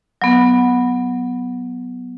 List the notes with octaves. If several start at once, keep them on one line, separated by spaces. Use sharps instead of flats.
F#3 B3